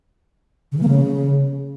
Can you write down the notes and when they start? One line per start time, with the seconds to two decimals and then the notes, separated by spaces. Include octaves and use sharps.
0.72 C#3
0.77 E3
0.83 A#3
0.88 C#3